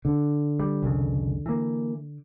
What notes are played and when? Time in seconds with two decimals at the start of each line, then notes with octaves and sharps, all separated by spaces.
0.05 D3
0.59 G3
0.82 C2 F2 C#3
1.46 E3 A#3